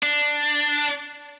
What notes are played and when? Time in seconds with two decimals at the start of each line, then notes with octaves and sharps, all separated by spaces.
0.03 D4